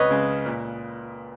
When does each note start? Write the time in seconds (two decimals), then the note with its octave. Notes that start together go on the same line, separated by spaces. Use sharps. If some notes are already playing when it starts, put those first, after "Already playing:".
Already playing: C#2 B4 C#5 D#5
0.10 C#3 G#3
0.46 A#2